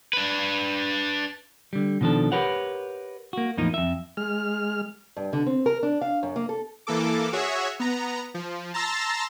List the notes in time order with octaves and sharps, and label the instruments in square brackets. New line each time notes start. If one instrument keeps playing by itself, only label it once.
[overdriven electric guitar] D4 B4
[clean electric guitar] D3 G3
B2 D#3 F3 D4 A4
G4 A#4 B4 C#5 F#5
A#3 F#4
E2 A2 F3 A#3 D#4
F2 E5
[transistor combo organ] G#3 F6
[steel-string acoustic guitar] G2
D3
C4
A#4
D4
F5
F#2
A#3
A4
[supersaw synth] E3 A#3 A4 D6
F#4 G#4 C#5 E5
B3 A#5
F3
A5 A#5 C6 E6 A6 A#6